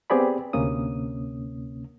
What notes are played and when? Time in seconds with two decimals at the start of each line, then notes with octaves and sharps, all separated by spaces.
0.10 B3 C4 G4 G#4 D5 B5
0.53 D2 C3 A#3 C#4 D#6